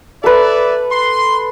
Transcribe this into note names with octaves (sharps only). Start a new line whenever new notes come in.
A4 B4 D5 E5
C6